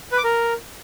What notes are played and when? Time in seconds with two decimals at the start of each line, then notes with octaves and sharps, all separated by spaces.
0.12 B4
0.18 D6
0.24 A#4